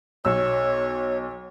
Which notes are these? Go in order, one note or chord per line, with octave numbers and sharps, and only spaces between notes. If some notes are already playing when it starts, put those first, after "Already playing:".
B1 C#5 E6